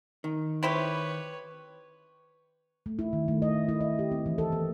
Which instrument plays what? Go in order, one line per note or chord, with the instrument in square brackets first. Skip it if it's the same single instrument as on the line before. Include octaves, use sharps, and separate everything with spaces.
[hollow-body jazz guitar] D#3
[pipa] C4 E4 G4 [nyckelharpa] B4 C#5
[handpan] A3
E4
D#3
A3
D#5
E4
D#5
G4
C4
E3
A4
A#3